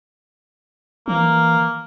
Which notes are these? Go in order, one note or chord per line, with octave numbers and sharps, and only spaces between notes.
E3 A#3